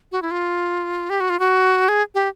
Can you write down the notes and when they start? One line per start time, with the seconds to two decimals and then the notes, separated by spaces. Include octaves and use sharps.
0.12 F#4
0.22 E4
0.31 F4
1.10 G4
1.20 F#4
1.30 F4
1.39 F#4
1.89 G#4
2.15 G4